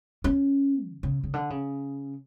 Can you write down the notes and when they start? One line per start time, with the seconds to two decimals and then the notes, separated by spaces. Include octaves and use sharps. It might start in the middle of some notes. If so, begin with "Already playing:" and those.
0.24 C#4
0.87 D3
1.03 C#3
1.23 C#3
1.34 D3
1.50 C#3